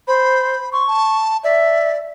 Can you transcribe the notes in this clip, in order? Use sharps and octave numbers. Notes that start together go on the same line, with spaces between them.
C5 B5
C6 C#6
A5
D5 E5